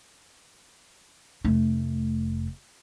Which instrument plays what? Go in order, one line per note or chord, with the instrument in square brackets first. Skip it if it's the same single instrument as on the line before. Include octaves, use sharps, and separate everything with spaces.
[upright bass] F1 A3